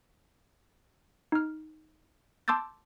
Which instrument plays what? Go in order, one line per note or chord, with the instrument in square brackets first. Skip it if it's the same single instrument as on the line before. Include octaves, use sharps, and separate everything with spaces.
[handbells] D#4 F6
A5 C6 D6 E6 G6 A6